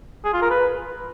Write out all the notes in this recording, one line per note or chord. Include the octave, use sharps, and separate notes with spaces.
G#4
F4
A#4
B4